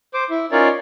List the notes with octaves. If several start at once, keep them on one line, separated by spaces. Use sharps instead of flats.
C5 D6
E4
C#4 D#4 F4 A#4 C#5 D5